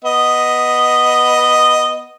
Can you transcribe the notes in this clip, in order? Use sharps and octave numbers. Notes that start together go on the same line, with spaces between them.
B3 D#5